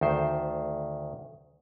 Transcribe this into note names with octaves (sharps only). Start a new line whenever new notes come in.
D2 D#3 C5